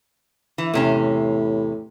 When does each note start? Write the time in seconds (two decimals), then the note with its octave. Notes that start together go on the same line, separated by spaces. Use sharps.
0.58 E3
0.74 E2 A2 C3 C#4